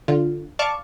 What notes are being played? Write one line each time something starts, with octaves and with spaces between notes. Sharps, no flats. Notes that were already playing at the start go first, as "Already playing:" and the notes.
D3 F4
D5 F5 A5 C#6 D6